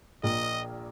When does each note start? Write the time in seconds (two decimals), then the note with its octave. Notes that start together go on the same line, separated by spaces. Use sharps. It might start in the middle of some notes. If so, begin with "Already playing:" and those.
0.23 A#1 A#2 A#3 D#5